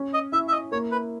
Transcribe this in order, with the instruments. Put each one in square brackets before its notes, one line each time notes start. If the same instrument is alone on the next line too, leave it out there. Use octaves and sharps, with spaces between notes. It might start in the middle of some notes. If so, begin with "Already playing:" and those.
Already playing: [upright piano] C#4
[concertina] D#5
[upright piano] E4 [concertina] E5
[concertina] E5
D#5
[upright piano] A#3 [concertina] C#5
[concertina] B4